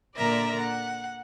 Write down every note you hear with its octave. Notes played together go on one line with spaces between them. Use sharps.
A#2 D3 A#4 D5 E5 A#5
F#5